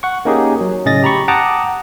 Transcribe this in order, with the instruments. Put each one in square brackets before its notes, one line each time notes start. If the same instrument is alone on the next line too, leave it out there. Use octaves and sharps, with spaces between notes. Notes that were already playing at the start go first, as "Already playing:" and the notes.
[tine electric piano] F#5 C#6
A#3 C#4 D#4 G4 G#4
F#3
A2 C#3 C#4 D#5 A6 A#6
G4 A#5 B5 C#6
F#5 G5 A5 A#5 D6 D#6